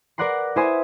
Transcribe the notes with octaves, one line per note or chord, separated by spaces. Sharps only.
A#4 B4 D5 F#5 A#5 C6
E4 B4 C5 G#5 D#6